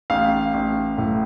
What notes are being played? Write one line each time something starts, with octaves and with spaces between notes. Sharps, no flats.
A1 F5
A1
A2